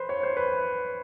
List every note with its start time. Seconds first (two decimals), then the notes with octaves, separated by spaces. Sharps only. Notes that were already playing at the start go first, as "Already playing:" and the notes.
Already playing: B4 C5
0.09 C#5
0.23 C5
0.37 B4